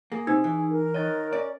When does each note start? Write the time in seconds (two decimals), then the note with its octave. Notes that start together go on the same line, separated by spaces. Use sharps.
0.12 A#3 G#4
0.27 C3 D#4 B4
0.44 E3
0.70 A#4
0.94 D#3 C#5 D#5 A6
1.33 C#4 D5